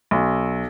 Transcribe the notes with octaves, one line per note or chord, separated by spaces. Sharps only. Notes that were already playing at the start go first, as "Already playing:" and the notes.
B1